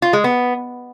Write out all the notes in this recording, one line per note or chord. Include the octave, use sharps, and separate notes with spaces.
F4
G#3
B3